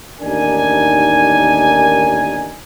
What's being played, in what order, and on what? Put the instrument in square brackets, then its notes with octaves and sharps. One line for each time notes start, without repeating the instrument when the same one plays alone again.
[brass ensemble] A1 D#2 D4 D#4 A#4 G#5